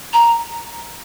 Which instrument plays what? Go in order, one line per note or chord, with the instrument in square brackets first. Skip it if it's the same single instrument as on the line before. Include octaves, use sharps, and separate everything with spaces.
[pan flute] A#5